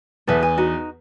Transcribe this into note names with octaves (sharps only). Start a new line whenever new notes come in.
E2 B3 A4 B4 E5
G#5
D#4 F#4